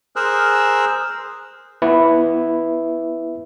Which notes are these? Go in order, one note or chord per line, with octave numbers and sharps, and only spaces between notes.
G#4 A#4 C5 E6 F#6
B3 E4 B4 E5